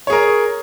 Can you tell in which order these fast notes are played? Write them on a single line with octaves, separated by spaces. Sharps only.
C#5 G#4 A#4